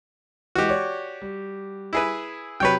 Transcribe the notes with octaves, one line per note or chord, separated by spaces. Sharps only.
E3 G#3 F#4 G4
C#5 D5
G3
E4 G#4 B4
C3 F#3 B4 C#5 G5